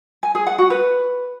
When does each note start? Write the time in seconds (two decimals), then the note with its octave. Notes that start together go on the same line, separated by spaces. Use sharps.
0.23 G#5
0.35 G#4
0.47 F#5
0.58 F#4
0.70 B4